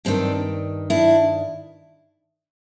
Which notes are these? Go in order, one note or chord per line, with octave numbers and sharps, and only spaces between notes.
G2 D#3 C4 D4
D4 E4